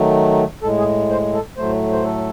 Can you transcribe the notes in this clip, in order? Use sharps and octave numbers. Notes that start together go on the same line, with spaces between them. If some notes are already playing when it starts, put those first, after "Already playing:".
Already playing: D#3 F#3 A3
A2 G#3 A4
G#4
C5
A4
A2 F#3 A3 C5
C5
A4